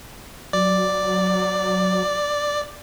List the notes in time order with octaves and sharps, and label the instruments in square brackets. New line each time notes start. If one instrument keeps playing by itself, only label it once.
[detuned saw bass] F#3 [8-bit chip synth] D5